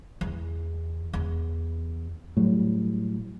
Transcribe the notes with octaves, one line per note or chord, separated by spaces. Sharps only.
E2
E2
A2 F#3 G3